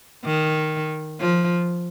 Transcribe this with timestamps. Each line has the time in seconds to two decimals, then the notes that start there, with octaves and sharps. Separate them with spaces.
0.25 D#3
1.20 F3